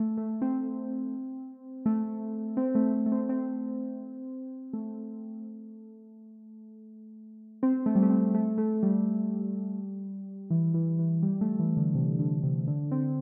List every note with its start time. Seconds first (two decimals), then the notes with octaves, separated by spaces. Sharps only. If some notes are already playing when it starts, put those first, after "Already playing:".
Already playing: A3
0.17 A3
0.42 C4
1.86 A3
2.57 C4
2.75 A3
2.94 A3
3.06 A3
3.12 C4
3.29 C4
4.73 A3
7.63 C4
7.86 A3
7.95 G3
8.02 A3
8.10 C4
8.34 A3
8.58 A3
8.83 G3
10.50 E3
10.74 E3
10.99 E3
11.23 G3
11.41 A3
11.59 E3
11.77 D3
11.95 C3
12.19 D3
12.43 C3
12.68 D3
12.91 C4